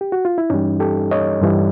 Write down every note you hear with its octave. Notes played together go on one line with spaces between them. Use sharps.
G4
F#4
F4
E4
G2 E3 G3 C#4 D#4
G4 A4
C#5 D#5
G2 E3 G3